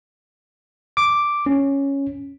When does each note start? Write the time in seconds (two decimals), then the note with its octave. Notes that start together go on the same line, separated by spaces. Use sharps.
0.97 D6
1.46 C#4